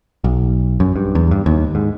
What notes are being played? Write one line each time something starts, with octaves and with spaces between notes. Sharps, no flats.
B1
F#2
G2
E2
G2
D#2
G#2